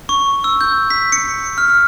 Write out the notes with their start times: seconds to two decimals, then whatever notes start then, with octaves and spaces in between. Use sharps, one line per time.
0.09 C#6
0.44 E6
0.61 G6
0.90 B6
1.12 C#7
1.58 F6